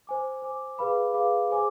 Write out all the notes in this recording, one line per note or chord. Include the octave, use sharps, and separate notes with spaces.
C5 G#5 D6
C5 G#5 D6
G#4 B4 F5 B5 D6
G#4 B4 F5 B5 D6
G#4 C5 G#5 D6